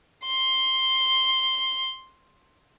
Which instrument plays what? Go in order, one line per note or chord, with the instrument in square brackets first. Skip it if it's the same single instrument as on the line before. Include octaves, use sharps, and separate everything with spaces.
[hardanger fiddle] C6